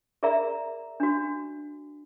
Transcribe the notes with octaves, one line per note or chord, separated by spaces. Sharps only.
G#4 A#4 D5 E5 A#5
D4 F#4